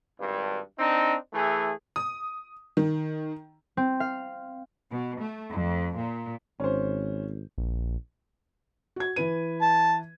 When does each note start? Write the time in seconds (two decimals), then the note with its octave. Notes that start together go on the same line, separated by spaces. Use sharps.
0.19 G#1 G2
0.79 C4 D4 D#4
1.33 E3 A3 G#4
1.96 D#6
2.77 D#3
3.77 C4
4.00 F5
4.90 B2
5.19 A3
5.53 F2
5.98 A#2
6.60 G#1 C#4 C5
7.58 A#1
8.96 F#4 G#6
9.16 E3 B4 D#7
9.62 A5